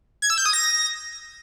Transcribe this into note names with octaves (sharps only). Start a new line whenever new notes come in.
G#6
E6
G6
D#6
A#6